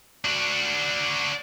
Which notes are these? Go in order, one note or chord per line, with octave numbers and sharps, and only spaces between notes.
D4 F#4